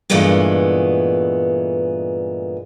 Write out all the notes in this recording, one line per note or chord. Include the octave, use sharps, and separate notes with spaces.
G2 A#2 E3 G#3 A3 B3